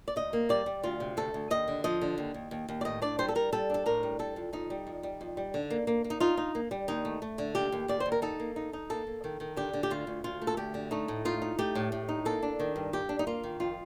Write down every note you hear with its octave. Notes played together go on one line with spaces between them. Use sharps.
D5
D2 D#5
A#3
G3 D5
G3
D2 F4
C3
D2 A4
D2
D#2 D#5
D3
F3 D#5
D3
D#2
D#2
D#2
D#2
D5
A2 D#5
D4 D5
G3 C5
A4
G3 A#4
G3 A4
D4 A4
A2 A#4
G3
G3 A4
F2
F2 D#4
G3
F2
G3
F2
G3
D3
A#3
A#3
A#3
D#4
D#4 F4
D#4
A#3
G3
D#2 D#4
A3
A3
D3
D#2 G4
D#2
D#2 D5
C5
D#2
A#4
D#4 A4
A#3
D#4
D#4
A#3 A4
A#3
D#3
D#3
D3 G4
D3
G4
D2 F4
D2
D2 F4
A3
A4
D2 G4
D3
A3 D#4
A2
D#4 F4
D#4
A3 G4
A2
A2
D#4
A#3 A4
D4
D#3
G2
G2 G4
D4
D#4
A#3 F4
D#3
F2 F4